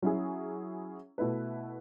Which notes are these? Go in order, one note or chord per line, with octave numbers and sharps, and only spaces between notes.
F#3 C#4 E4 G#4
B2 A3 E4 B4